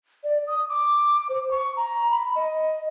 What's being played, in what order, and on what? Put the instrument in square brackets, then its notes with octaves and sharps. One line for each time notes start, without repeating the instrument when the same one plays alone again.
[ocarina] D5
D#6
D6
C5
C#6
A#5
B5
D#5